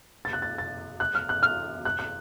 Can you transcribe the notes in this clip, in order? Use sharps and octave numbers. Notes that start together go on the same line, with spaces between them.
A6
F#6
A6
A6
F#6
F6
F#6
F6
F#6
F#6